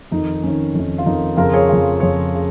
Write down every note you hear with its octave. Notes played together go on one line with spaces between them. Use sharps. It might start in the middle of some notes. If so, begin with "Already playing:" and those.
F2 D#3 D#4
F2 D#3 C#4
F2 D#3
F4
F2 D#3 D#4
F2 C#3 F4 A#4
G#4 C#5
F2 C#3
F2 C#3 G#4 C#5
C#3